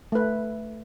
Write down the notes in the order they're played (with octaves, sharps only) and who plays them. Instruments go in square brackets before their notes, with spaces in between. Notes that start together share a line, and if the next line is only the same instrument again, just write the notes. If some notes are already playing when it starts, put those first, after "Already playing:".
[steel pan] A3 B4